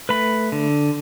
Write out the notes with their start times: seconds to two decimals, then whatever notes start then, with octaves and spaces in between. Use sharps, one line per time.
0.09 A3 B4 B5
0.52 D3